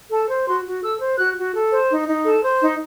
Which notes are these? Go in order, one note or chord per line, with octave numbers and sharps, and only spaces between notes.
A4 A5
C5
F#4 C6
F#4
A4 E6
C5
F#4 F#6
F#4
A4
C5
D#4
D#4
A4
C5
D#4